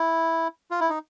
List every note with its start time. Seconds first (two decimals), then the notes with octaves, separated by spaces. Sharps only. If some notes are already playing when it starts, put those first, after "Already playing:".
Already playing: E4
0.71 F4
0.80 E4
0.89 D#4